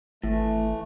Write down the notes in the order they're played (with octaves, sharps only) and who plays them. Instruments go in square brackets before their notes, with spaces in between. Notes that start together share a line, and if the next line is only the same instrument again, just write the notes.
[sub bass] G#1 [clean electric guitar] A2 [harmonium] E3 A3